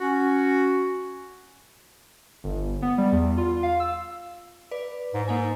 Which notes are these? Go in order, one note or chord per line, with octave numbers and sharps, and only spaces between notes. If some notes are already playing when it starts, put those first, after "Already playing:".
C#4 F#4
G1
B3
G3
E2
F4
F5
E6
B4 D5
G#2
G#2 A#3 D#4 G#5